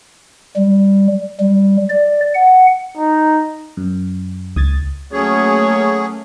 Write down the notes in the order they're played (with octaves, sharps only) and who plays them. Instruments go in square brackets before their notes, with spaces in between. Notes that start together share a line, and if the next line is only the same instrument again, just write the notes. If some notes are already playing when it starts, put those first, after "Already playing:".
[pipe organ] G3
G3
D5
F#5
[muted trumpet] D#4
[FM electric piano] F#2
[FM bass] C#2 [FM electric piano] D#6 G#6 A6
[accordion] F#3 G#4 [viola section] A3 A#3 C#4 [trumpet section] C#5